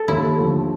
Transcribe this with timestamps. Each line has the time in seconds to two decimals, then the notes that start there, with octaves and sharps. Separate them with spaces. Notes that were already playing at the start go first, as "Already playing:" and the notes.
Already playing: A4
0.08 D#2 E4
0.36 D3 F3 A3